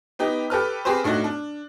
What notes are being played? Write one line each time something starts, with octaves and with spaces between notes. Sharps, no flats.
B3 D#4 G4
G4 A4 B4 F6
C4 G4 G#4 B4 C5
A2 D4 D#4 F#4
D4